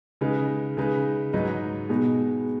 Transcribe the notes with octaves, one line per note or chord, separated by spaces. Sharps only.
C#3 G#3 D#4 B4
C#3 G#3 D#4 B4
G#2 F#3 D#4 B4 D#5
B2 G#3 B3 D#4